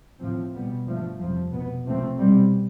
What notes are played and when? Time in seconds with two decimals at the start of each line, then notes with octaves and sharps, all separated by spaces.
0.19 A2 F3 C4
0.53 B2 G3 B3
0.86 G2 F3 A3
1.19 F2 C3 F3
1.51 B2 B3
1.84 C3 F3 A3 C4
2.18 B2 G3 C4